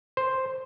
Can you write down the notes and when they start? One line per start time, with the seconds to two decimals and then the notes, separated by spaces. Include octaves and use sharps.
0.17 C5